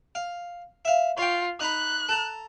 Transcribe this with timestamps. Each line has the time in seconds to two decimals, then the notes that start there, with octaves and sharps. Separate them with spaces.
0.15 F5
0.85 E5 F5
1.18 F4 C#5 G5
1.60 D#4 A#5 B5 F#6
2.09 A4 A5 A#5